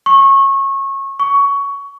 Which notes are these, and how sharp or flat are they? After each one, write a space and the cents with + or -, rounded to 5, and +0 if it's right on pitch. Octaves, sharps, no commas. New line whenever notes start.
C#6 -25
C#6 +15